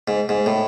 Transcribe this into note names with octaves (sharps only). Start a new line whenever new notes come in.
G#2
G#2
A2